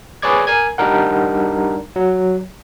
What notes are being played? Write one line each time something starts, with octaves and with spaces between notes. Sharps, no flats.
G#4 B4 C#5 D5 D6 G#6
A#4 G#5 G#6
G3 D4 D#4 A#4 F#5
F#3